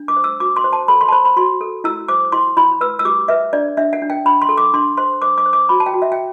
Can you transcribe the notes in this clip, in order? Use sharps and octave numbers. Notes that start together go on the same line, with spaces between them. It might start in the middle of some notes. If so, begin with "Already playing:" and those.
Already playing: D4
D6
C5
E6
F#4 D6
C6
C5
A5
A4 B5
C6
A5
C5 B5
B5
F#4 C6
A4
E4 E6
C5 D6
E4 C6
E4 B5
B4 E6
E6
G4 D6
B4 E5
D4 D5
D4 E5
F#5
D4
G5
D4 B5
C6
A4
D6
D4 C6
C5 C6
C5 D6
D6
C5
D6
F#4 B5
A5
G5
F#4
E5
G5